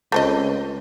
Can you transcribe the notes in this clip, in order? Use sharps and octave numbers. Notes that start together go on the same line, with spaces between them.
C#2 A3 C4 D#5